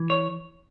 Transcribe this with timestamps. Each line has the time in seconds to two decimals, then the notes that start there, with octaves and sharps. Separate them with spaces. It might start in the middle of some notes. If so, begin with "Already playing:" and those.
Already playing: E3
0.10 C#5